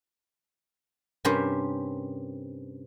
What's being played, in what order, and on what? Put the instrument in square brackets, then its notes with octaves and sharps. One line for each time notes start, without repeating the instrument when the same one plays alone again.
[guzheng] G2 C3 C#4 G4 A#4 C5